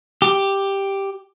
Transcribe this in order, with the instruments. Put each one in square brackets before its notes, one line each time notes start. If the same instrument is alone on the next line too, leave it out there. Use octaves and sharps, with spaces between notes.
[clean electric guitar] G4